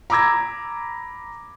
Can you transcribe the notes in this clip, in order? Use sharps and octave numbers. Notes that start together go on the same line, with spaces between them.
A#5 B5 D6 E6 G#6 A#6